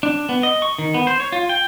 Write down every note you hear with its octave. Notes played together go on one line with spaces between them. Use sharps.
D4
B3
D#5
C#6
D#3
B3
C5
C#5
F4
G5